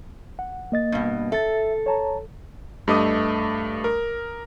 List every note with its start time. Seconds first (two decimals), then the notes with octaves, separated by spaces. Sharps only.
0.39 F#5
0.72 A#3 D#5 A6
0.92 G2 B2
1.32 A4 E5 A6
1.86 C#5 A5 A#5
2.88 G2 A3 D#5 D6 D#6
3.84 A#4